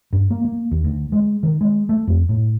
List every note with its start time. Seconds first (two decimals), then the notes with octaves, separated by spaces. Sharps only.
0.13 G2
0.30 A#3
0.45 A#3
0.71 D#2
0.84 D2
1.12 G#3
1.43 D#3
1.61 G#3
1.89 A3
2.07 F2
2.29 A2